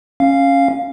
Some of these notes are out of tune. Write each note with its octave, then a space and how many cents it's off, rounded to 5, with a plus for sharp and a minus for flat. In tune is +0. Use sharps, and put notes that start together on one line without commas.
C#4 -10 F5 +0